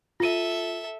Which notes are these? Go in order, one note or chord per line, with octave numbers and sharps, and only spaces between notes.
F4 A4 E5 D#7